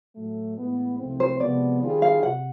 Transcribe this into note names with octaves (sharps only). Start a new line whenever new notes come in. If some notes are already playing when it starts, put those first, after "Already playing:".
A2 F#3 A3
A2 E3 G#3 B3
C2 C3 F3 A3 C4
C5
C3 F3 G#3 B3 D5
D#3 G3 C4 F4 G#4
F5
C3 F#5